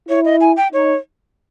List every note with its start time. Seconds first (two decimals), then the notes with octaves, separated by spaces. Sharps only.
0.08 E4 C#5
0.25 D#5
0.41 G#5
0.57 G5
0.72 D#4 C#5